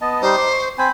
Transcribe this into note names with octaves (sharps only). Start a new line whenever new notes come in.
B3 D#5 A5
G3 D#4 C5
D6
C#6
C4 C5 G#5 B5